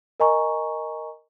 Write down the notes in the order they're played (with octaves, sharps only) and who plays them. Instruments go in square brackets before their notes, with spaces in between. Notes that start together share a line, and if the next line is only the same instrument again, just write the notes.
[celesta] A#4 D#5 G#5 A#5 C#6